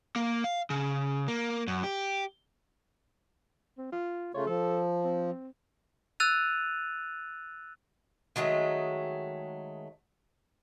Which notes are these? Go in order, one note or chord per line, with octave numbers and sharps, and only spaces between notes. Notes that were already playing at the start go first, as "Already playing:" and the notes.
A#3
F5
C#3
A#3
F#2
G4
C4
F4
C#3 A3 F4 C#5
F3 A4
C4
E6 F#6 A6 D#7 F7
D#3 F#3 G#3 A3